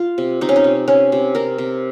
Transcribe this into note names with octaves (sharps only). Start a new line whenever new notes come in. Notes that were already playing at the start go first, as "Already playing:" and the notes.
Already playing: F4
C3
C3 D#4
C#4
D#4
C3
C3 C#4
C3
C3 A#4
C3